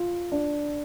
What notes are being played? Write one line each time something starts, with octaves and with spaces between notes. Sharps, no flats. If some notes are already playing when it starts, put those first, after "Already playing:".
Already playing: F4
D4